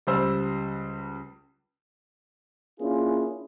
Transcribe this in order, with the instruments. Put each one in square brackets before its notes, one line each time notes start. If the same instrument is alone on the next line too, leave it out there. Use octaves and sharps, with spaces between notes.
[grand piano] C#2 G3 C5 E6
[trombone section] A#3 C#4 D4 E4 F4 G#4